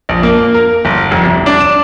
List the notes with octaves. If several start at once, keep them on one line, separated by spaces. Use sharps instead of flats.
A#1
A#3
A#4
G1
F1
C2
D4
E7